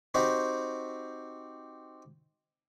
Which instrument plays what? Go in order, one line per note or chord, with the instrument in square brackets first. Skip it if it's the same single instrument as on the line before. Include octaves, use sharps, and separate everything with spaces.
[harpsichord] C4 D#4 F#4 G4 C5